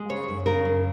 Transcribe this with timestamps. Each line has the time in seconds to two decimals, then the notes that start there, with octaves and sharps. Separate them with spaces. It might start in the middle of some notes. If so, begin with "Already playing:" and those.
Already playing: G#3
0.09 C#3 C#5
0.28 F#2
0.46 C#3 A#4
0.65 F#2